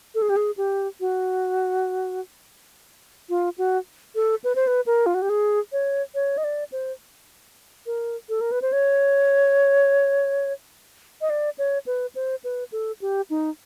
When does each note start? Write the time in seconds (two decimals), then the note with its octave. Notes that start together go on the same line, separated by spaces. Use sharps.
0.15 A4
0.22 G#4
0.30 G4
0.36 G#4
0.57 G4
1.00 F#4
3.29 F4
3.58 F#4
4.15 A4
4.44 B4
4.55 C5
4.67 B4
4.86 A#4
5.06 F4
5.14 F#4
5.22 G4
5.29 G#4
5.72 C#5
6.15 C#5
6.38 D#5
6.44 D5
6.72 C5
7.86 A#4
8.29 A4
8.41 A#4
8.52 B4
8.62 C5
8.73 C#5
11.21 D#5
11.30 D5
11.58 C#5
11.87 B4
12.15 C5
12.44 B4
12.72 A4
13.02 G4
13.30 D#4